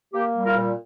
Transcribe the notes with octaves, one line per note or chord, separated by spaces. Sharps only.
A#3 G4
G3
F4 A#4
A#2